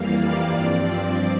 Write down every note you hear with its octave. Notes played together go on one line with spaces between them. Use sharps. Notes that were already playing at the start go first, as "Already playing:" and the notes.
Already playing: F2 E3 G3 A#3 F5
D5
G2 F3 C4 D5